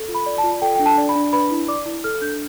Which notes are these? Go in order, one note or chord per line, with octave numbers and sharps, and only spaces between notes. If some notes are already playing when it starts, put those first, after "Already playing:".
Already playing: A4
F4
B5
D5
A5
F4
A4 G5
D4 G5
A5
D5
B5
D4
B4 B5
E4
D5 D6
E4
A4 F6
D4 G6